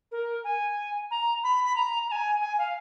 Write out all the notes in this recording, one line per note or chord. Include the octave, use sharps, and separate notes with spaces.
A#4
G#5
A#5
B5
B5
A#5
A#5
G#5
G#5
F5